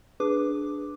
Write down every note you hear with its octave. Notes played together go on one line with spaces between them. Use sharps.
D4 G#4 B4 D6